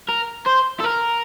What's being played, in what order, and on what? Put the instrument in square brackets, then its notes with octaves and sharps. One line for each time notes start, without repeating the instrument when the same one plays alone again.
[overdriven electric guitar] A#4
C5
A4
A#4